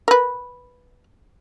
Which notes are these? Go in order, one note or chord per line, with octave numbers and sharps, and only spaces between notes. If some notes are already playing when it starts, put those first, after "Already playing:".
A#4 B4